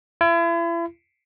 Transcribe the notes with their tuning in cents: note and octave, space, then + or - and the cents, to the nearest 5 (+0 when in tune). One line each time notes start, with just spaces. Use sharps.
E4 +40